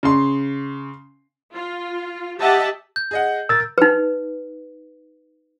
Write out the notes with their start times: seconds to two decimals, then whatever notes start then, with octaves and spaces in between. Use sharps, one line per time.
0.03 C#3 C6
1.54 F4
2.40 G4 D#5 E5 F#5 A5
2.96 G6
3.11 G#4 D#5 F#5
3.49 A#4 E6 A6
3.78 D#4 B4